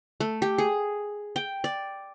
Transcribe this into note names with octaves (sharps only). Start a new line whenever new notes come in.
A3
G4
G#4
G5
D5